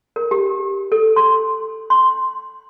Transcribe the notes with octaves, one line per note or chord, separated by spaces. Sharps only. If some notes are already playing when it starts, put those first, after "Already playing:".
A#4
G4
A4
C6
C6